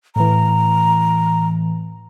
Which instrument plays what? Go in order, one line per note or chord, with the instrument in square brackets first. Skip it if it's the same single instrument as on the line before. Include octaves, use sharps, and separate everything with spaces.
[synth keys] A2 E3 [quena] A#5